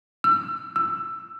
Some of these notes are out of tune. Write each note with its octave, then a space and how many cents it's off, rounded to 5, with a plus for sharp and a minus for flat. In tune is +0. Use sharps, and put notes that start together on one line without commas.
E6 +35
E6 +15